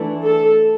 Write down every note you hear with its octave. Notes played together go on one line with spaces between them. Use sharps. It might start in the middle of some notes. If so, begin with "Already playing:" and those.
Already playing: E3 A3 D4
A4